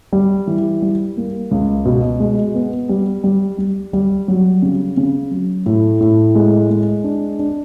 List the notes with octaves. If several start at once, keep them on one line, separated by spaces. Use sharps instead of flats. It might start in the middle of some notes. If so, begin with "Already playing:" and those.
G3
E3
G3
A#3
C#2
B2
G#3
B3
G3
G3
G3
G3
F#3
C#3
C#3
F#3
A2
A2
G#3
G#3
D4
D4